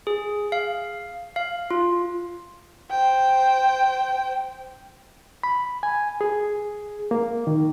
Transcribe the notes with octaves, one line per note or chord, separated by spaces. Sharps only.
G#4
F5
F5
F4
C5 G5
B5
G#5
G#4
A#3
D#3